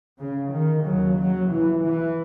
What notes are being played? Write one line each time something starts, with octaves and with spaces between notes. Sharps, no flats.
C#3
D#3
D#2 C#3 F#3
F#3
E3
E3